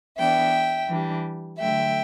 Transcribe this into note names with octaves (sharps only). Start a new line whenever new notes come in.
E3 B3 D4 E5 G5
E3 G3 D4
D3 F#3 A3 E5 G5